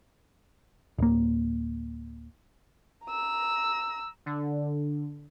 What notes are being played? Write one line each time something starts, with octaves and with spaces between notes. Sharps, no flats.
D1 A#3
A#5 E6
D3